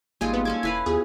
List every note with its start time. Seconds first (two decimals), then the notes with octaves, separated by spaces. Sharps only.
0.21 G#1 G3 G#3 A#3 D#4 F4 G#5
0.33 B3
0.45 C#4 A4 D6 G#6
0.63 E1 E4 B4 F5
0.86 D#2 B3 F4 G4 G#4